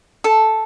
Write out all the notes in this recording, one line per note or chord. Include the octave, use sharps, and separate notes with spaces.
A4